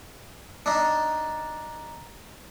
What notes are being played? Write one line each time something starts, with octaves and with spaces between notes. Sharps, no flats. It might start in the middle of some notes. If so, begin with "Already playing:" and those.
D4 D#4